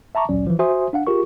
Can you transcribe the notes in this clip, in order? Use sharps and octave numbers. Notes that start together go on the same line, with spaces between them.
E5 A5 A#5 C#6 D6
A1 D2 A#2 F#3 C#4 D5
E3 F3
F#4 C5 E5 G#5 C6 D#6
D4 F5 F#5
F4 G4 G#4 A#4 C#6